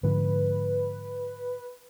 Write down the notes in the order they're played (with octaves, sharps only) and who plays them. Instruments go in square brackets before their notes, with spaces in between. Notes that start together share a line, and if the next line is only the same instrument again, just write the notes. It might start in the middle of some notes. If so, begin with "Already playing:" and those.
[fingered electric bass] G#2 D3 F3 [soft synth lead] B4